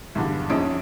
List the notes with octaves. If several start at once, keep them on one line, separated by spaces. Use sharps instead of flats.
B1 E2 G2 D3
A#1 F2 C#4 D#4 D#6 D7